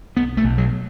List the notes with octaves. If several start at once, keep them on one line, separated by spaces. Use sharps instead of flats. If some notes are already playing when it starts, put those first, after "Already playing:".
B1 B3
A3
B1
F#3